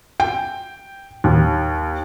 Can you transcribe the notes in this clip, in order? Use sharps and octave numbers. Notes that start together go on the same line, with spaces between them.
G5
D#2